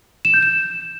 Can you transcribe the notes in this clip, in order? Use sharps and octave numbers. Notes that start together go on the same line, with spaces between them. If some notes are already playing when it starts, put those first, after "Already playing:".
E7
G6
E7